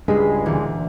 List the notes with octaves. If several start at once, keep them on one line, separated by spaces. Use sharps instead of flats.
C#2 G2 G#3 B5 C7
D2 A#2 E3